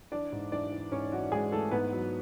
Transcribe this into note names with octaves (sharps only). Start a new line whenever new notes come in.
E3 D4 D5
G#2
E3 D4 D5
E3
G#2 C#4 C#5
E3 F#4
G#2 G#3 G#4
E3 A3 A4
G#2 B3 B4
F#3